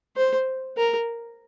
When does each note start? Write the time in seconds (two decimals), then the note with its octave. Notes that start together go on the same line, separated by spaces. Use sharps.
0.16 C5
0.77 A#4